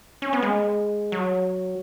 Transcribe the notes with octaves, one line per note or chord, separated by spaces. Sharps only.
C#4
B3
G#3
F#3